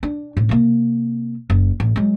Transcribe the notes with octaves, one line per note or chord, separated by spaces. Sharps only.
D4
A2
C3 A#3
F#1
A1
F#3 G#3